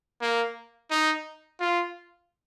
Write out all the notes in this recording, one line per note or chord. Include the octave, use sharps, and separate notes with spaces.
A#3
D#4
F4